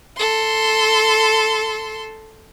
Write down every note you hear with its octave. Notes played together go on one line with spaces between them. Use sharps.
A4 C6